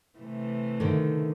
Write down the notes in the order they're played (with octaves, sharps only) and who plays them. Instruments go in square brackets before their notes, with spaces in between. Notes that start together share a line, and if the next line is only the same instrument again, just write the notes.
[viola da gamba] C3 E3 A3
[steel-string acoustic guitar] D3 D#3